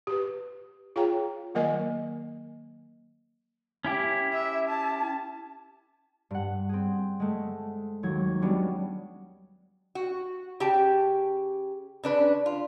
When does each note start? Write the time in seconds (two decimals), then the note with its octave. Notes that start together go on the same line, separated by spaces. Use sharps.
0.07 G4 B4
0.96 F4 G#4 C#5 F5 G5 A#5
1.54 D#3 F#3 A#3 A#4 D#5 G#5
3.85 C#4 E4 G4
4.33 E5
4.69 A5
6.31 G2 F#5
6.69 C4 G#4
7.20 G#3 A3
8.03 D#2 F#3 G#6
8.42 G3 G#3 B3 C#4 D4 F#4
9.95 F#4
10.60 C#3 G4 G5 A5
12.03 C#3 D4 B4
12.46 F4